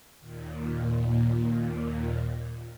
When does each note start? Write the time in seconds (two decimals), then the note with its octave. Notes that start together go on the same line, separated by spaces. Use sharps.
0.20 D#2 A#2